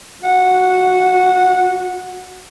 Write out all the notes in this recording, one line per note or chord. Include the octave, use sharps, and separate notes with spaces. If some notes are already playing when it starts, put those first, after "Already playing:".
F#4 F#5